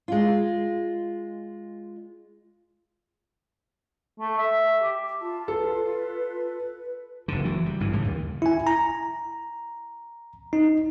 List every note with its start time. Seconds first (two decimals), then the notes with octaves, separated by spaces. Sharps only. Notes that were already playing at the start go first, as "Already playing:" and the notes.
0.08 G#3 F4
4.20 A3
4.38 E5
4.83 G4
5.21 F4 A5
5.48 A4 B4
7.28 F#1 D3
7.45 E3 F#3
7.66 G3
7.80 G1 G2 E3
7.93 A2 C#3 G3
8.05 D#2
8.42 E4 G#5
8.67 A#5
10.53 D#4